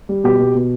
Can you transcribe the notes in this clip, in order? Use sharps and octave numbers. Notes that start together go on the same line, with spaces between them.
G3
B2 G4
B2
B2